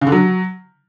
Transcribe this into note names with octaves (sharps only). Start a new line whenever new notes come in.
C#3
D3
F#3